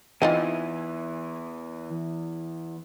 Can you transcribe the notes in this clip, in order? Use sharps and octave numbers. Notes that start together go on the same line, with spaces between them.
E2 E3 C4 D#4 F4 G#5